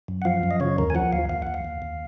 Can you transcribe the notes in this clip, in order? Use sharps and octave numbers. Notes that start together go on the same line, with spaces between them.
F#2
F#5
F3 F5
F#2
D#5
C#3 C#5
D#2 A#4
G#5
F3 F#5
D#2 F5
D#2 F5
D#2 F#5
F5
D#2
D#2